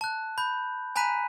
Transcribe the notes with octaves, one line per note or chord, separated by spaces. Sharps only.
A5 F#6
B5 G6
G#5 A#5 B5 F#6 B6 D#7